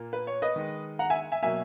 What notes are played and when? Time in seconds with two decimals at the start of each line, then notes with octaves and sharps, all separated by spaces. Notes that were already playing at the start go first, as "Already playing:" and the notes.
Already playing: A#2 A#3
0.13 B4
0.27 C#5
0.42 B4 D#5
0.56 D#3 G#3
0.99 F#5 A#5
1.10 E5 G#5
1.32 E5 G#5
1.42 B2 F#3 A#3 E5 G#5